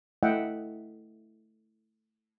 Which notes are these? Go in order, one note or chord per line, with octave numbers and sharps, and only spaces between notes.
A3 E4 D#5 E5 F#5 G5